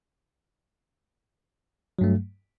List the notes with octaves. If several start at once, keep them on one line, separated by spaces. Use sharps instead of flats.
G2 F#3 A3